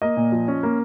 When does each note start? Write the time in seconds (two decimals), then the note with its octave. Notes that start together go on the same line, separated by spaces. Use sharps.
0.02 A#3 D#5
0.17 A#2
0.32 F3
0.48 C#4
0.63 A#3